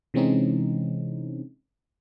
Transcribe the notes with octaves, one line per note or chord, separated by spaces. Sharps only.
C3 E3 G#3 C4 C#4 D#4